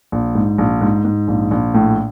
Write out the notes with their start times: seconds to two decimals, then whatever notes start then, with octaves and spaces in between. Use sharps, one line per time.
0.12 A#1
0.35 G#2
0.58 A#1
0.81 G#2
1.05 G#2
1.28 A#1
1.51 A#1
1.74 A2